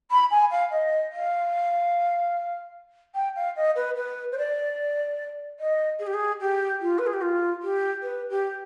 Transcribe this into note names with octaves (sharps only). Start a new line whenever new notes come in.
B5
G#5
F5
D#5
F5
G5
F5
D#5
B4
B4
C5
D5
D#5
G#4
G4
G#4
G4
F4
B4
G#4
G4
F4
G4
B4
G4